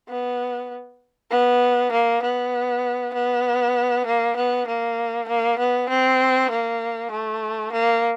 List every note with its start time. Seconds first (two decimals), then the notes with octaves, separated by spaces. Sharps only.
0.09 B3
1.31 B3
1.92 A#3
2.22 B3
3.14 B3
4.06 A#3
4.36 B3
4.67 A#3
5.28 A#3
5.59 B3
5.89 C4
6.51 A#3
7.11 A3
7.73 A#3